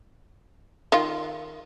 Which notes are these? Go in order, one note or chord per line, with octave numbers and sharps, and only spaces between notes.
D#3 F4